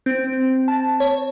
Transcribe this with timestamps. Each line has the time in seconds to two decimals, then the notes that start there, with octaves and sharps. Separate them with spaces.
0.06 C4
0.68 A5
1.00 C#5